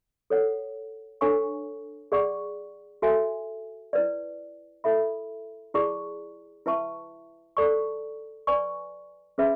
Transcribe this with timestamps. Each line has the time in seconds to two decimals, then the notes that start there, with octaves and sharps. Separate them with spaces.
0.30 A4 C#5 F#5
1.21 D4 A4 C#5 G#5 C#6
2.12 G#4 D5 F#5 C#6
3.02 F#4 A4 E5 G#5
3.93 E4 B4 D5
4.84 E4 A4 E5 B5
5.74 E4 G#4 D5 A5 C#6
6.66 E4 B4 E5 A5 C#6
7.57 A4 D5 A5 C#6
8.47 B4 D5 G#5 C#6
9.38 C#4 G#4 B4 E5 B5